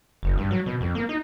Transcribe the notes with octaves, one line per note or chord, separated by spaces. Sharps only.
F#1
G2
F#3
B2
F2
A#3
D#4